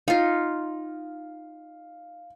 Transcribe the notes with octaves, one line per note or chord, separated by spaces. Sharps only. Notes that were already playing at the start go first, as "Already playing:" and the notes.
D#4 F4 F5